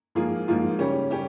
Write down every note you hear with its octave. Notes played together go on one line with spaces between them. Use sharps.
G#2 F3 A#3 F4 G#4
G#2 F3 A#3 F4 G#4
C#3 G3 C#4 G4
G3 C#4 G4